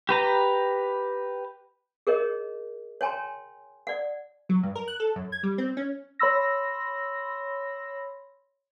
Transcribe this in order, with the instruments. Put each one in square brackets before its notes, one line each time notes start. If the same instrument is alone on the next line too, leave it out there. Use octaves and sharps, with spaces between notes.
[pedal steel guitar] G4 B4 A#5
[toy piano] G#4 A#4 C#5 D#5
C#5 G5 G#5 A#5 C6
D5 F#5
[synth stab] F#3
G2
A#4
F#6
A4
F#2
G#6
G3
C4
C#4
[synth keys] C#5 B5 C6 E6 A#6